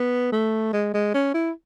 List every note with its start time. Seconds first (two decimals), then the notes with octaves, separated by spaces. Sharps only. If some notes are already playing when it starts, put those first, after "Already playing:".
Already playing: B3
0.32 A3
0.73 G#3
0.94 G#3
1.14 C#4
1.34 E4